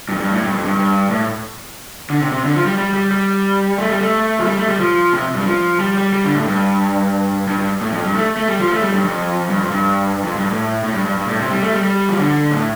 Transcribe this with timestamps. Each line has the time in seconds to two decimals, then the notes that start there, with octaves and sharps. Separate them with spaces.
0.09 G2
0.15 F2
0.21 G2
0.32 A2
0.43 G2
0.54 F2
0.65 G2
0.77 G2
1.10 A2
2.10 D3
2.22 C3
2.32 C3
2.44 D3
2.55 F3
2.67 G3
2.78 G3
2.94 G3
3.11 G3
3.78 A3
3.90 G3
4.00 A3
4.39 F3
4.45 G3
4.57 A3
4.68 G3
4.80 F3
5.13 C3
5.35 G2
5.41 G3
5.46 F3
5.80 G3
5.97 G3
6.13 G3
6.24 D3
6.35 A2
6.48 G2
7.47 G2
7.58 G2
7.81 A2
7.93 F2
8.04 G2
8.15 A3
8.37 A3
8.49 G3
8.60 F3
8.72 A3
8.82 G3
8.94 G2
9.05 F2
9.50 G2
9.60 F2
9.71 G2
10.23 F2
10.36 G2
10.50 A2
10.84 A2
10.95 G2
11.06 G2
11.17 G2
11.28 A2
11.40 C3
11.51 G3
11.62 A3
11.73 G3
11.84 G3
12.09 F3
12.18 D3
12.51 A2